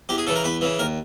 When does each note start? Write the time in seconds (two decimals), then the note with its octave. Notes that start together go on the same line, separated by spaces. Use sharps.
0.09 E2 G4
0.18 G#4
0.27 C#3 E3 A4
0.36 A#4
0.44 E2 B4
0.61 C#3 E3
0.79 D#2 A#4